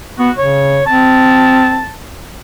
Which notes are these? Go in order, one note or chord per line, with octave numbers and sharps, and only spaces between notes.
B3 F#4
C#3 C#5
C4 A5